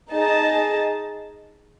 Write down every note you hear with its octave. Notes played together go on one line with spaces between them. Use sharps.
D#4 G#4 D#5 A5